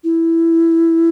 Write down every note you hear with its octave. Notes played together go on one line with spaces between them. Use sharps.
E4